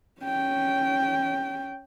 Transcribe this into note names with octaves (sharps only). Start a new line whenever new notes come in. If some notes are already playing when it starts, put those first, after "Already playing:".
C#4 G5